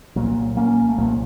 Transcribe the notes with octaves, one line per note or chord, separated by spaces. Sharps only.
C2 A#2 F#3 A#3
A#3 C#4
A3
C2 A#2 F#3 A#3